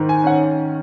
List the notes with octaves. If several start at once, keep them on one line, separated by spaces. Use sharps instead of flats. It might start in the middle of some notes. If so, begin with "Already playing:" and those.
Already playing: G#2 D#3
G#5
C#4 F#5